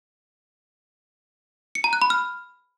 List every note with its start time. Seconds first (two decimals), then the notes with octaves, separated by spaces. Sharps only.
1.75 C#7
1.84 A#5
1.93 F#6
2.02 B5
2.10 F6